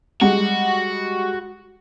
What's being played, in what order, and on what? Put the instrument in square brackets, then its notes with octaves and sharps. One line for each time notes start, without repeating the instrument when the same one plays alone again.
[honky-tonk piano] G3 G#3 F#5 [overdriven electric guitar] F#4